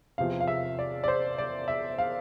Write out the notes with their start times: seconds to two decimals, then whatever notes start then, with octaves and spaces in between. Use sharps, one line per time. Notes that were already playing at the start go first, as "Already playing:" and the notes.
0.18 E2 C3 F3 F5
0.41 F5
0.48 E5
0.79 D5
1.04 D5
1.08 C5
1.38 D5
1.68 E5
1.98 F5